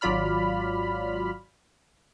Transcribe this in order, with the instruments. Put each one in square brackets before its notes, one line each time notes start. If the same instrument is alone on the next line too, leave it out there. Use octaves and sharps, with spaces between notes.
[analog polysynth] G#1 F#3 F4 D5 B5 F6